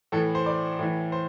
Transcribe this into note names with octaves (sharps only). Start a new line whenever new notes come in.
A2 E3 A4
C5
D5
A2 E3
C5